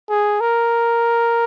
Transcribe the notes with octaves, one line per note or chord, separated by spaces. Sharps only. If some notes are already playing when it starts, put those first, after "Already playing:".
G#4
A#4